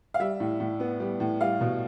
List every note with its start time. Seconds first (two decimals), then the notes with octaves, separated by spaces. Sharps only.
0.14 F5
0.20 G3 E5
0.40 A2
0.60 A2
0.80 B3
1.00 G3
1.20 A2
1.41 G3 F5
1.61 B2